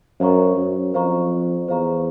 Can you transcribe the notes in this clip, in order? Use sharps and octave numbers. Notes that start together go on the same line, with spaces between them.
F#2 C5 F5 A#5 C#6
F#2
F2 C5 F5 A#5 C#6
E2 C5 F5 A#5 C#6